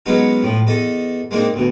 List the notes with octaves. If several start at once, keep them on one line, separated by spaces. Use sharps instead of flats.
F#3 G#3 B3 C#4 D#4
A2 F3
E2 A4 D#5
G#3 A#3 C4 D4 D#4
D2 B2